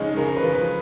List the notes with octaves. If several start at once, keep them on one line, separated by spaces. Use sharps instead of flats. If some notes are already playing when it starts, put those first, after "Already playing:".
Already playing: C#3 F3 G#3 C#4 D#4
C#3 A#4
A#4
B4
F3
B4